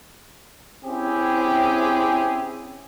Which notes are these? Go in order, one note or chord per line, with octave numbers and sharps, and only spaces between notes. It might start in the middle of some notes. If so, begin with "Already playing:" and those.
C4 C#4 E4 G4 G#4